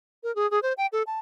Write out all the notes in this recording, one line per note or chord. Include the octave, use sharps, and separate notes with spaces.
A#4
G#4
G#4
C5
G5
A4
A5